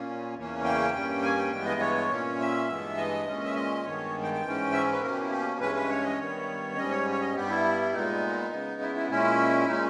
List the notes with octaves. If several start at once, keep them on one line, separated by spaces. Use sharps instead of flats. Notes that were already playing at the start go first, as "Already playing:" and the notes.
Already playing: A#2 A#3 C#4
E2 C#3 E3 A#3 C#4
G5
G2 G3 A#3 C#4
G#5
G5
G2 E3 G#3 B3 G5
D#5
C#5
A#2 A#3 C#4
E5
G2 E3 G#3 B3
D#5
A#2 G#3 C#4
E5
D#5
G2 D#3 G#3 B3 C#5
G5
G5
G#2 E3 G#3 C#4
E5
B4
B2 A#3 C#4 A#4
G4
E4
G4
G2 E3 G#3 C#4 B4
B4
C#5
D#5
G2 D#3 G3 B3 C#5
G#2 G3 C#4 D#5
C#5
C#5
D#5
G2 G3 B3 G4
E4
A#2 G#3 B3 D#4
C#3 G#3 B3
E4
E4
A#2 G#3 C#4 E4
A#2 G#3 C#4 D#4